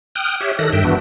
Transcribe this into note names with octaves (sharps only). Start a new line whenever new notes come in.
G5 D#6 F6 F#6
G4 C#5 E5
D#3 A4 F#6 A#6
G2 E5 G5
E3 B3 D4 F#4